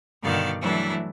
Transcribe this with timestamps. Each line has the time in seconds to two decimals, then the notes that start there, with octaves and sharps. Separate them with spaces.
0.23 G2 B2 D3 D#3 D5 F5
0.62 E3 F#3 G3 A3 D4 E4